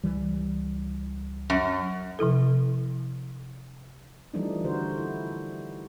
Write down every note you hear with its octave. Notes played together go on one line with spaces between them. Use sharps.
C#2 E3 G3
F#2
C3 F3 E4 A4
E3 F3 G3 A3 D4 D#4
D3 F#4 A#4 C5
E4